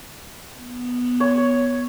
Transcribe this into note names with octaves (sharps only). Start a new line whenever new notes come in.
B3
C#5